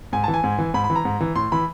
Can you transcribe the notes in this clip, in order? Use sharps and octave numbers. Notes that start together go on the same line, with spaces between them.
G#2 G#5
E3 A5
G#5
G#2
E3
G#2 B5
B5
E3
A#5
G#2
E3
A2 C6
E3 B5